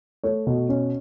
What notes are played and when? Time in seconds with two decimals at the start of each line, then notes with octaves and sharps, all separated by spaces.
0.24 A3 C#5
0.47 B2
0.69 C#4